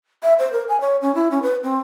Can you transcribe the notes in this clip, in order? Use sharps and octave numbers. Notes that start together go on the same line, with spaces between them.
E5
C5
A#4
G#5
C#5
C#4
E4
C#4
B4
C4